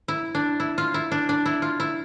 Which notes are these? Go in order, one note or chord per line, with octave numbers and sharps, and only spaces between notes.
E4
D4
E4
F4
E4
D4
D4
E4
F4
E4